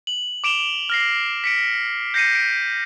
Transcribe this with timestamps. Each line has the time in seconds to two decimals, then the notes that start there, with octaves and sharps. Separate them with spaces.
0.07 F#7
0.44 D6 D7 E7 F7 G7
0.90 F6 A#6 C7
1.44 B6 C#7 D7
2.14 G6 A#6 C7 C#7 D#7
2.35 D7